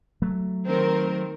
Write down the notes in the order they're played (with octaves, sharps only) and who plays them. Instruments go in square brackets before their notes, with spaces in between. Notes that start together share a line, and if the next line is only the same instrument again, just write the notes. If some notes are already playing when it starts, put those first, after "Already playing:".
[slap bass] F#3 A3
[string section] D#3 C4 A#4